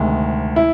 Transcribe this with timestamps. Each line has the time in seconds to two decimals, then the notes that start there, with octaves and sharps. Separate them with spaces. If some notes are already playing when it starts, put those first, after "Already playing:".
Already playing: D2 C3 D#3 G#3
0.56 E4